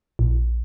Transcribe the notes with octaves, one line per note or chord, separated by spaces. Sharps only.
A#1